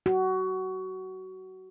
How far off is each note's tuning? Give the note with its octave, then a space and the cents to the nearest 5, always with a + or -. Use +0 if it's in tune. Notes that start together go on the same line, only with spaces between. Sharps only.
F#4 +20